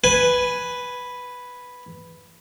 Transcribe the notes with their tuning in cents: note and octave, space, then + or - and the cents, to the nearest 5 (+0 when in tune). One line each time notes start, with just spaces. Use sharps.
B4 +0 G#5 +0